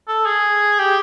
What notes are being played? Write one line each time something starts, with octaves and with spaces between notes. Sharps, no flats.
A4
G#4
G4